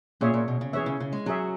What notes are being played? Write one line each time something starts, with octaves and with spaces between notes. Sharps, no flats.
A#2 C#4 G#4 C#5 E5
A#2
B2
C#3
E3 C#4 G#4 C#5 E5
C#3
C#3
G#3
F#3 C#4 G#4 C#5 E5